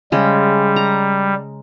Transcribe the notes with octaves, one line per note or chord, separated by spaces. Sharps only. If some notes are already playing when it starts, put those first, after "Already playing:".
C#3 G3 G#3
A#5